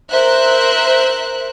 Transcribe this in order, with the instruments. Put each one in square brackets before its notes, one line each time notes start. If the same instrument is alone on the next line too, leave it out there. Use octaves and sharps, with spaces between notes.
[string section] A#4 C5 E5 F#6